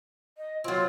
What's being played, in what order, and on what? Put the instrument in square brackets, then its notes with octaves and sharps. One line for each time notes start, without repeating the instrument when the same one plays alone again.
[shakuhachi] D#5
[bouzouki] F#3 C4 [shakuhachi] F4